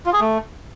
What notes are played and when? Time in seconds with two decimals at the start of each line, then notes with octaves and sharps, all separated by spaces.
0.06 F4
0.13 G#4
0.20 A3